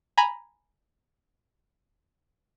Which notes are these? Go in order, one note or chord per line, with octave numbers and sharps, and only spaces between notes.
G#5 A#5 B5